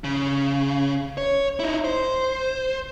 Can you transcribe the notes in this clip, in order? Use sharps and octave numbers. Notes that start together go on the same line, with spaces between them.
C#3
C#5
D#4 E4
C5